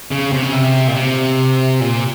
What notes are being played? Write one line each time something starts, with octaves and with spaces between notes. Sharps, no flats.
C#3
C3
C#3
C3
A#2
C3
A#2